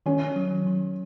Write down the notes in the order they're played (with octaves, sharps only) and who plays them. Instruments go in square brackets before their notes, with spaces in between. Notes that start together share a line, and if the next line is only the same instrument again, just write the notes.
[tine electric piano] D#3 [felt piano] C#4
[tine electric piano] F#3
D#3